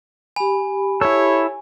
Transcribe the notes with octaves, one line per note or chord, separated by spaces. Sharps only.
G4 G#5 B5
E4 A4 C#5